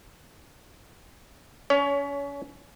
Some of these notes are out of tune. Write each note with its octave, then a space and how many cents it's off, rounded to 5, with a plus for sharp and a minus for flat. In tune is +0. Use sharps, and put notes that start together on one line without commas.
C#4 +30 C#5 +20